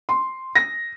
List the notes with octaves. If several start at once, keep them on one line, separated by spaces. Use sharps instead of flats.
C6
A#6